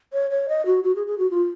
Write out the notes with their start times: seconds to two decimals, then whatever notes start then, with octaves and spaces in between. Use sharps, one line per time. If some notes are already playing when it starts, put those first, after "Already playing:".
0.13 C#5
0.31 C#5
0.49 D#5
0.66 F#4
0.84 F#4
0.96 G#4
1.07 G#4
1.19 F#4
1.31 F4